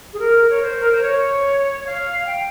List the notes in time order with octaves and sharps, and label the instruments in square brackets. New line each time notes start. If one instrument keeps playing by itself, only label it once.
[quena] G#4
A#4
C#5
C5
A#4
C5
C#5
F5
G5